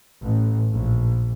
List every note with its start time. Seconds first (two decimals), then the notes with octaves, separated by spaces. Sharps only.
0.23 A1
0.72 A#1